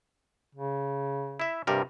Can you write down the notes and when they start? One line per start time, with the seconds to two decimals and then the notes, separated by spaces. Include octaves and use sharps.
0.55 C#3
1.40 E4 E5
1.67 G2 C3 G3 A#4